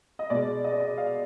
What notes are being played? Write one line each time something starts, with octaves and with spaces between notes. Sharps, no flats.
D#5
B2 G#3 D5
D#5
D5
D#5
F5